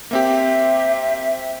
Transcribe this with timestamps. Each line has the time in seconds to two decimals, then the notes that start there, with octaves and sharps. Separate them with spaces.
0.11 A#3 C4 G4 E5